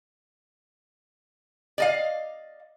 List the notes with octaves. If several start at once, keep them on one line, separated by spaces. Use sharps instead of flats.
D5 D#5 F5